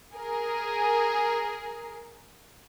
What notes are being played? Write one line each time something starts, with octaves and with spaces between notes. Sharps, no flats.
G#4 A#4